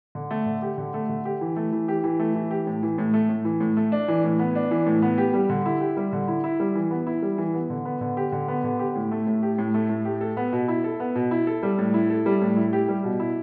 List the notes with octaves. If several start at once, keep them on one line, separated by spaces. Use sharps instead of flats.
D3
A3
D3
G4
D3
A3
D3
G4
E3
A3
E3
G4
E3
A3
E3
G4
A2
E3
A2
A3
A2
E3
A2
A3
D4
E3
A2
B3
D4
E3
A2
B3
G4
G3
D3
E4
G4
G3
D3
E4
E4
G3
E3
B3
E4
G3
E3
B3
D3
B3
D3
G4
D3
B3
D3
G4
A2
A3
A2
G4
A2
A3
A2
G4
A4
B3
B2
E4
A4
B3
B2
E4
A4
G3
A2
E4
A4
G3
A2
E4
G4
G3
B2
E4